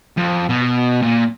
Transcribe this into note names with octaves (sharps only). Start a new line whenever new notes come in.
F2
B2
A#2